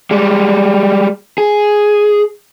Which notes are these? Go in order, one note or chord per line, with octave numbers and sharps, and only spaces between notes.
G3 G#3
G#4